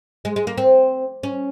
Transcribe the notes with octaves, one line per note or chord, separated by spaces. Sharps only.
G#3
G#3
A#3
C4
C#4